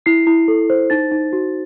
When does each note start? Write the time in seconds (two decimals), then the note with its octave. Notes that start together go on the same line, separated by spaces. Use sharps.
0.06 E4 C7
0.27 E4
0.48 A4
0.70 C5
0.90 D#4 A6
1.12 D#4
1.33 F#4